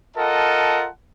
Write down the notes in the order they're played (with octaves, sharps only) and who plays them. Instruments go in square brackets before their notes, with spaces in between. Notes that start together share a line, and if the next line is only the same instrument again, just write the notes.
[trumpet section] F4 A4 A#4 D#5 F#5 A5